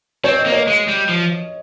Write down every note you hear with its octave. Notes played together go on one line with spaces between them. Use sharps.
C4 C#5
D#5
A#3
C#5
G#3
G3
F3